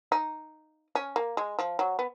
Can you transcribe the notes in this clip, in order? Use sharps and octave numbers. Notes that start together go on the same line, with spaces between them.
D#4
C#4
A#3
G#3
F3
F#3
B3